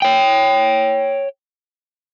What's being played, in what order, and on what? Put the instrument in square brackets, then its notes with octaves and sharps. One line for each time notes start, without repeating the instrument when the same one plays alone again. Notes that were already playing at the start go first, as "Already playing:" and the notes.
[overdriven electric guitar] C#5 G5